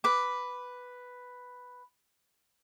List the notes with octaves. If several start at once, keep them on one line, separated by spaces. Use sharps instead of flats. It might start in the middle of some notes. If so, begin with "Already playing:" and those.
B4 D6